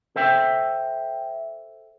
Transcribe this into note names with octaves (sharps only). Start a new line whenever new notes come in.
A4 C5 E5 G5